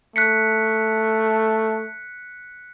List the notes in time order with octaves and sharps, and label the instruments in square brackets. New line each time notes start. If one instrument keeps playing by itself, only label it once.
[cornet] A3 [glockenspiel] F#6 B6 C#7